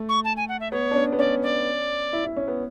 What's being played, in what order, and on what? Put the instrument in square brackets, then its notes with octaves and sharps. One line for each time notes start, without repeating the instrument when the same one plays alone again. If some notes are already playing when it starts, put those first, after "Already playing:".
Already playing: [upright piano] A3
[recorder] C#6
A5
G#5
F#5
E5
[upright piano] B3 [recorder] C#5
[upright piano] D4
C#4
B3
[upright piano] C#4 [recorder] D5
[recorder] D5
[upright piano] E4
E4
C#4
B3